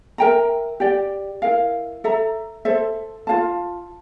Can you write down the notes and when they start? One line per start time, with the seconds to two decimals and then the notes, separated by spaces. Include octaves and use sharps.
0.18 A#4 E5 G5 A#5
0.80 G4 D5 G5
1.42 E4 A#4 F5
2.04 A4 E5 A#5
2.65 A4 C5 E5
3.27 F4 C5 F5 A5